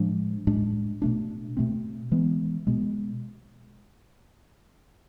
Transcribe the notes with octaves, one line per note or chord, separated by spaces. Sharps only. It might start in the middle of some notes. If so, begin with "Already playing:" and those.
Already playing: A2 F3 G#3 D4
A2 G#3 D4
B2 A3 D4
B2 A3 C4
E3 G#3 B3
B2 G#3 B3